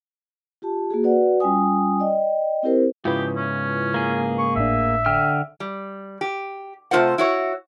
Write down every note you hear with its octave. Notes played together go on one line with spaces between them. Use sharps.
F4 G4 A5
A#3 F#4 G#4
F#4 B4 D5 F#5
G3 C#4 F4 G5 G#5 D#6
D5 D#5 G5
C4 E4 G4 A#4 C5
G#2 C#3 E4 F4 G4 B4
C#4
A#3 G#4
C#6
G#1 A2 D4 E5
D3 G5 F6
G3
G4
C3 A3 C4 F4 C5 F#5
E4 F#4 C#5